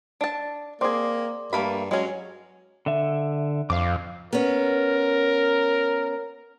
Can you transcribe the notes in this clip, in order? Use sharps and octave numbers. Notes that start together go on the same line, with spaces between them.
D4 A5
A#3 C4 G#4 D5 C6 D6
G2 A3 A#3 B5
F#3 G#3 C#4
D3 E5
F2 F5 D6
B3 C#4 A#4